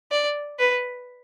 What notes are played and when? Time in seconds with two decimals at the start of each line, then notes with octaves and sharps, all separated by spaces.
0.12 D5
0.59 B4